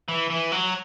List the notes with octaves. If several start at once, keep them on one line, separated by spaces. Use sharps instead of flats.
E3
E3
F#3